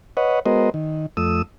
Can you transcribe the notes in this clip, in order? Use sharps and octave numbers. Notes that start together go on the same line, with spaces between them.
B4 C#5 D#5 F#5
G#3 B3 F#4 A#4 C5 D#5
D#3
F2 A3 D#6 E6